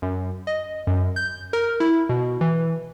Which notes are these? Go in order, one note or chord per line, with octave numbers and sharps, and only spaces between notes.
F#2
D#5
F#2
G6
A#4
E4
B2
E3